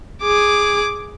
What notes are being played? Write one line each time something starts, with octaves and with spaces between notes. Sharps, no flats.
G#4 D6